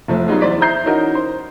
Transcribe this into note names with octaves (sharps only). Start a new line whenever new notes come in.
F1 F3 A3
F#3 G3 B3 D#4 F4 G#4
E2 C5 D5 B6
C5 E5 A#5 G6 C7
E3 C#4 D#4 F#4 A#4 D#5
C5